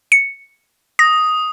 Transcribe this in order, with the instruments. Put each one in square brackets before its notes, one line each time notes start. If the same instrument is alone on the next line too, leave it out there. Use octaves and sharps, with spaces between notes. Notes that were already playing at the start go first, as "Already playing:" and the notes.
[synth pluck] C#7
[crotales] D#6 [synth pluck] A#6